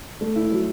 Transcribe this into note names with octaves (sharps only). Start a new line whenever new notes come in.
A3
E4
F#3